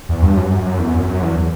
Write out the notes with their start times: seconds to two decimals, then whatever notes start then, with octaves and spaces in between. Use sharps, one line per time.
0.09 E2
0.22 G2
0.37 F#2
0.51 F#2
0.65 F#2
0.79 E2
0.94 F#2
1.08 F#2
1.22 E2